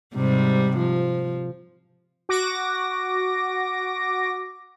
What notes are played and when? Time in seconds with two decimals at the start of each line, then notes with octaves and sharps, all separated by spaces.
0.16 G#2 C3 G3
0.77 F3
2.29 F#4 D6 A#6